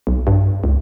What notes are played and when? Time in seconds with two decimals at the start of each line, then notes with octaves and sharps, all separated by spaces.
0.07 B1
0.27 G2
0.64 C#2